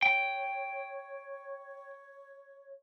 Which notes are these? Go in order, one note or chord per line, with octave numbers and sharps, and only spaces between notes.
C#5 G5